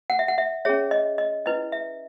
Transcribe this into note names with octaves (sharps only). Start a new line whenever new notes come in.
F#5
E5
F#5
E5
C#4 G#4 C#5 E5
D#5
D#5
C#4 E4 B4 D#5
E5